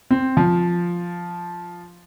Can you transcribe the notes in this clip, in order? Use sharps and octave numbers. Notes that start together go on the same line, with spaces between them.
C4
F3